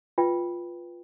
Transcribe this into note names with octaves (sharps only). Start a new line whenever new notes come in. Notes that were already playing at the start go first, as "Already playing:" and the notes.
F4 B4 G5